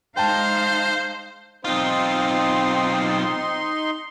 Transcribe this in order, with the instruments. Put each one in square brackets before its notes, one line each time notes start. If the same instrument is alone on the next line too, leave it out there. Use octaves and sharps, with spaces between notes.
[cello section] G#3 D#4 F5 [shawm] C5 [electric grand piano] G5 A5
[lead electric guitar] B1 F4 [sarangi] C4 [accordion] D#4 C6